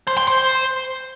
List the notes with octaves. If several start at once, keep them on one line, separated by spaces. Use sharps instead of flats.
C5
C6
C5